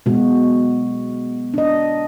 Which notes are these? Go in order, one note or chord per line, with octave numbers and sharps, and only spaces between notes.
B2 G#3 F#4
D4 D#5